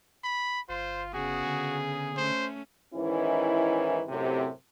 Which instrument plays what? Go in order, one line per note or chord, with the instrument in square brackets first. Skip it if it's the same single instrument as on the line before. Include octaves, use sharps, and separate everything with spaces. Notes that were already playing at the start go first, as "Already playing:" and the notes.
[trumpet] B5
[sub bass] G1 [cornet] F4 [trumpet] C5
[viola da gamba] C#3 B3 [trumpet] F#4 [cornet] G#4
[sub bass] D3
[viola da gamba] A3 C#4 [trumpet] C5
[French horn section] G#2 D#3 E3 C#4 E4
F#2 A2 C3